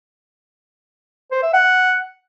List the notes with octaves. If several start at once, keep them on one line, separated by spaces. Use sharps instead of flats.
C5
E5
F#5